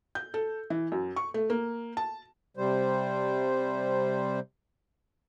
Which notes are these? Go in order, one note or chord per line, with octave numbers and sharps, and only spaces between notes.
G6
A4
E3
F#2
C#6
A3
A#3
A5
C3 G3 C5